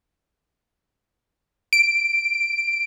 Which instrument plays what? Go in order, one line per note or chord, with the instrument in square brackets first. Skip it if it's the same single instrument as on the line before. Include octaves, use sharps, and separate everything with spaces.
[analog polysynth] D7